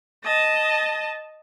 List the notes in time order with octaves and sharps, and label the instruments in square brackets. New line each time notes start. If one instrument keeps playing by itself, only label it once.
[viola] D#5 A5